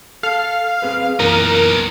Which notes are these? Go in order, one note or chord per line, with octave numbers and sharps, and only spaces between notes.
A4 F5
C4 G#4 B4
F#2 A#2 E3 B3 D#4 A#4